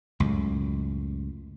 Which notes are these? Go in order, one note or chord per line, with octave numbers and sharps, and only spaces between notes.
C#2 F#2 A2